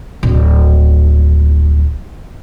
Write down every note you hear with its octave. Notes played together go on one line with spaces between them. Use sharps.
D1 A#1